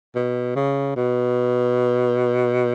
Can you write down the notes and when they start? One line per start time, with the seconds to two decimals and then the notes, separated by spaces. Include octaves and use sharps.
0.15 B2
0.56 C#3
0.96 B2